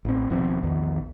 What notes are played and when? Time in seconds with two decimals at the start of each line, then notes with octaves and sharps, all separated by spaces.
0.05 A1 C4
0.30 D#1 B2 F3 C4
0.63 A#1 E2 D#3